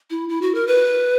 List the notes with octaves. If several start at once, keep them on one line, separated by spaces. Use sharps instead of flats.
E4
E4
F#4
A#4
B4